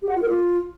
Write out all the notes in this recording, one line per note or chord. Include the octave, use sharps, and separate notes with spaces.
G4
F#5
F4
A#4
F4